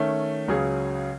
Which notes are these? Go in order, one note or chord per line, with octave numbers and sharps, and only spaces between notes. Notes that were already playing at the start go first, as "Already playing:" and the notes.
Already playing: D#3 A3 C#4
C#2 C#3 F#3 C#4 G#4